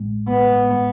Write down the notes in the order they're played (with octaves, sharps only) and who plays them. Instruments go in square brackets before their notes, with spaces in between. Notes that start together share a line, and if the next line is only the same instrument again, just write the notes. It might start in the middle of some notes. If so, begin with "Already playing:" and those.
Already playing: [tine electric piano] A1 A2 G#3
[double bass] B3